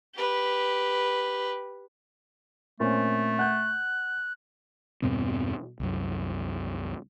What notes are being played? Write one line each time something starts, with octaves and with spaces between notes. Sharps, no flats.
G4 B4
A#2 A3 C4 C#4
F#5 F#6 G6
E2 G2 B2 C4
C2 F#2